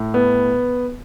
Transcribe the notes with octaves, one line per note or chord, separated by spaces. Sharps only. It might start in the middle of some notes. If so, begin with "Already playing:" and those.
Already playing: A2
B3